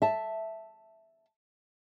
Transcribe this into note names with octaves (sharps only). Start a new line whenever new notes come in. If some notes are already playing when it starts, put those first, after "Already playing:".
E5 A5